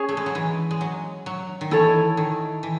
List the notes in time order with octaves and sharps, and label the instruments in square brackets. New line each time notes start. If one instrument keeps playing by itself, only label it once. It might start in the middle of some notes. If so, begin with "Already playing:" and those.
Already playing: [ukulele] C#4 G#4 C#5
[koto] A3
G#3
F#3
E3
G#3
F#3
F#3
D#3
[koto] E3 [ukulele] E4 A4 C#5
[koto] D#3
E3